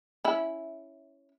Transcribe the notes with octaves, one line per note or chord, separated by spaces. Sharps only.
C#4 E4